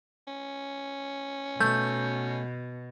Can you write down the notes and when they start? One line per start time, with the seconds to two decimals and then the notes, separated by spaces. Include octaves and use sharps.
0.27 C#4
1.60 B2 A3 G6